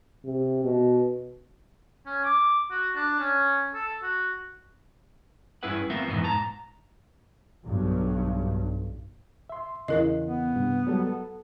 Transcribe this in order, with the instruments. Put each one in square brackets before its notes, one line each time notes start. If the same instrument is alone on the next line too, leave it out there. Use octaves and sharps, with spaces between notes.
[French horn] C3
B2
[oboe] C#4
D6
F#4
D4
C#4
A4
F#4
[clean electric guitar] G2 C#4 E4 G#4 B4 F#5
A3 B3 C4 F4 A#4 E5
F2 G#2 B2 E3 B3 D#4
G#2 A5 A#5
[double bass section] B1 G2
[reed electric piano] E5 C6
[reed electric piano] E2 C#3 E3 [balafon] E4 A#4 D#5
[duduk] B3
[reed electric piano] G2 C3
F#3 G3 A4
A4